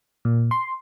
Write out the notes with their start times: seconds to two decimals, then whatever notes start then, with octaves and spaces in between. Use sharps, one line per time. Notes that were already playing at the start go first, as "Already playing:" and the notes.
0.25 A#2
0.51 C6